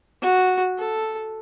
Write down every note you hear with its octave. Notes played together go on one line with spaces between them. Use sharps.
F#4
A4